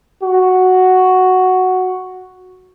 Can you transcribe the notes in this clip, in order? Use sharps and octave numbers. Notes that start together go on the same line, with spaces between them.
F#4